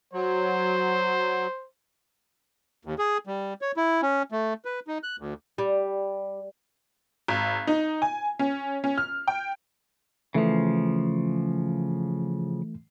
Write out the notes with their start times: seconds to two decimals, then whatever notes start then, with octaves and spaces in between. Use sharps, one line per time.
0.14 F#3 C5
2.85 D#2
2.99 G#4
3.27 G3
3.61 C#5
3.77 E4
4.02 C#4
4.32 A3
4.65 B4
4.87 D#4
5.03 F#6
5.19 D2
5.58 G3
7.28 G#1
7.67 D#4
8.02 G#5
8.39 C#4
8.84 C#4
8.98 F6
9.27 G5
10.34 C#3 E3 F3 A3